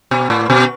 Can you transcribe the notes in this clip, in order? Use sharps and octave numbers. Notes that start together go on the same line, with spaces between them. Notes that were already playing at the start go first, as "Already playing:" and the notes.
B2
A2
B2